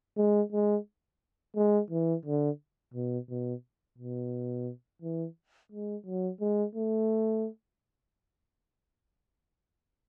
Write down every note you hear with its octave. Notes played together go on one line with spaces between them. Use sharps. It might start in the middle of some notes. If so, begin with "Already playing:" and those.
G#3
G#3
G#3
E3
D3
B2
B2
B2
E3
G#3
F#3
G#3
A3